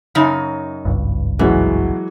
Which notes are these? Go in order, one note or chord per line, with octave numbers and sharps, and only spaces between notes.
F#2 C#3 D#4
G#1 C#2 G2
B2 E3 F#3 G#3